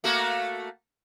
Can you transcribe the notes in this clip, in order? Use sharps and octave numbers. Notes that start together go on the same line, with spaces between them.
A3 A#3 F#4